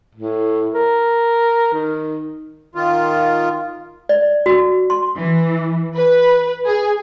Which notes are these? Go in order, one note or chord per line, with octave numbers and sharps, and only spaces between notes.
A2
A#4
D#3
D#3 F4
D5
F#4
C6
E3
B4
G#4